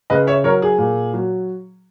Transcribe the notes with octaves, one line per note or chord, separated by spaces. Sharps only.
C#3 B4 D#5
C#5 E5
F#3 A#4 C#5
G#4
A#2
F#3